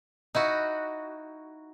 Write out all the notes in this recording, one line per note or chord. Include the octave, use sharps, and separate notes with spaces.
D#4 E4 F#4